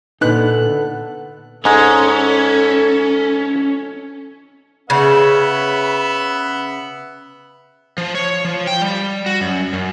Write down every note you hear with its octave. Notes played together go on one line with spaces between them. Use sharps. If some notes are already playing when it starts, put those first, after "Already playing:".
A#2 D3 B3 D#4 A4 F#6
G#2 G#3 C#4 A4
C#3 B3 E5 F#5
F3
C#5
F3
G5
G3
F#4
F#2
F#2